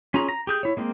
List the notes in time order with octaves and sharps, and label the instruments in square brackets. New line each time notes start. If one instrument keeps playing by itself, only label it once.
[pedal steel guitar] C#4 F4 G#4 A#5
A#5
G4 G#4 G6
E4 C#5
G#3 A#3 C4